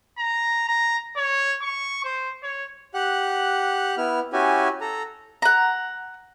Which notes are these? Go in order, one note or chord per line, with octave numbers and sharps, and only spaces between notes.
A#5
A#5
C#5
C#6
C5
C#5
G4 F#5 F#6
B3 E4 F6
C#4 E4 F#4 G4 G#5
A4 A#5
F#5 A#5